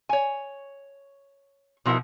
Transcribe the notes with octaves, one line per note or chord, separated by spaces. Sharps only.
C#5 G#5
B2 F3 E4 A#4 F#5